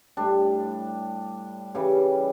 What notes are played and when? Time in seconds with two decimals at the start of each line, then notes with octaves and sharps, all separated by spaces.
0.17 A2 G3 D4
1.75 C#3 E3 G3